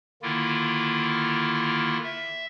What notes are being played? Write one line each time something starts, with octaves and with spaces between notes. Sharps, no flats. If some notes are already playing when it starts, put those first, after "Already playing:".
D3 D#3 A#3 E4 F4
E5